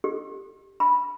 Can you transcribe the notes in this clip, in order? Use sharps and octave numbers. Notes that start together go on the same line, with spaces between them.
G4
B5